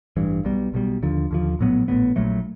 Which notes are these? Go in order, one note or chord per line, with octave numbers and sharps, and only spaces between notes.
A1 G2 E3
B1 B2 G3
B1 B2 G3
D#2 D3 F3
D#2 D3 F3
A#1 A2 F#3 B3
A#1 A2 F#3 B3
A#1 A#2 F#3 A3